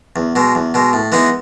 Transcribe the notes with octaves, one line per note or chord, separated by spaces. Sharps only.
E2
B2 G#3
E2
B2 G#3
A2
E3 G#3 B3 D#4